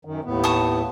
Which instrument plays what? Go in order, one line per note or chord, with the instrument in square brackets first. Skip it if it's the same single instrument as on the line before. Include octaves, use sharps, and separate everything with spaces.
[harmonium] F#2 D#3
D#2 A2 B3
[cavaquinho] A5 C#6 D#6